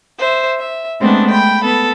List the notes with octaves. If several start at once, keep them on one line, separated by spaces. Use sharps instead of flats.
C5 E5
E5
G#3 A3 B3 C4 D4
G5 B5
B3 A4